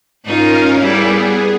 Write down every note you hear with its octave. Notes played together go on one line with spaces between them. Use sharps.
G#2 C#4 D#4 F4 A#4 F5
G3 B3 E4 G#4